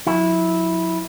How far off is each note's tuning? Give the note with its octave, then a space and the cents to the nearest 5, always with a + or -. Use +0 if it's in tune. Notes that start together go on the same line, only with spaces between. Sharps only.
F#3 -45 E4 -10